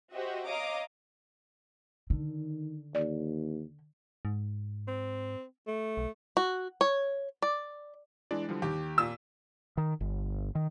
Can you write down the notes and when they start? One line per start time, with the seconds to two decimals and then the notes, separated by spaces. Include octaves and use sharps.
0.14 F#4 G4 C5 D#5 E5
0.48 C#5 D#5 F5 A#5 D6 D#6
2.10 D3 D#3
2.95 D#2 D5
4.25 G#2
4.88 C4
5.68 A3
5.97 B1
6.37 F#4
6.81 C#5
7.42 D5
8.31 E3 G#3 D4 D5
8.49 D3 F3 G3
8.62 D#2 G4
8.98 A#2 E6
9.77 D#3
10.01 G1
10.55 D#3